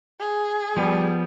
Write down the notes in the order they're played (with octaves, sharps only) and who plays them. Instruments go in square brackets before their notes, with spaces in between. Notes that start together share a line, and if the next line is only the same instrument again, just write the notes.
[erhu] G#4
[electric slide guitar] F3 B3 [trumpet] G3